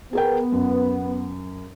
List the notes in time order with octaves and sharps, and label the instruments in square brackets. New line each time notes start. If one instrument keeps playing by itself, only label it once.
[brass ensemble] B3 [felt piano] G#4 A#4 G5
[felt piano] F#2